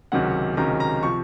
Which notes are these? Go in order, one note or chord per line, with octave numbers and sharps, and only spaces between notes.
C#2 C3 D#3 F#3 C#4 F#5
C#2 C3 D#3 F#3 C#4 A#5
A#5
C3 F3 C#6